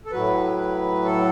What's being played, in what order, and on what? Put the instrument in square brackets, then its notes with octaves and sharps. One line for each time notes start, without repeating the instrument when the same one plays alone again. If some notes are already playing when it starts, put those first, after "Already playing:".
[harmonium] A4
A2 F#3 B4
B4
A4